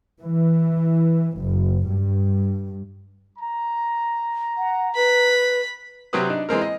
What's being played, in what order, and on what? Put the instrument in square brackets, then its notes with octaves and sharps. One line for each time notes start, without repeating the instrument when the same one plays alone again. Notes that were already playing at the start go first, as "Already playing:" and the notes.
[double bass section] E3
F#1
G2
[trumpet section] A#5
[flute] F#5
[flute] B4 [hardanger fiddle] B5
[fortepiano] C3 F#3 C4 G4 B4 D#6
D4 D#4
E3 G#3 C4 A#4
D#5